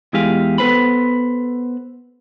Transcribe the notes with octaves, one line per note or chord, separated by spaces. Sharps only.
E2 G#3 E4 G4 G#4 F5
B3 A4 B4 C5 B5